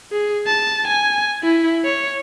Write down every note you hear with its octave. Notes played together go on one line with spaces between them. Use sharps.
G#4
A5
G#5
E4
C#5